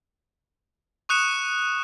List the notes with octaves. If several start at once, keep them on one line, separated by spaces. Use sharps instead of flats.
C#6 D#6 F#6 C#7 E7